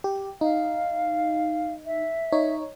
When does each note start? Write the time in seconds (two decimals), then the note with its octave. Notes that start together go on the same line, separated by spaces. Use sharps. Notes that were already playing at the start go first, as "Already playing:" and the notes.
0.04 G4
0.41 D#4 F5
1.86 E5
2.32 D#4 C#5